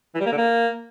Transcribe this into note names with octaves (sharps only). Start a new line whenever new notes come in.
E3
G3
A#3
D3
A#3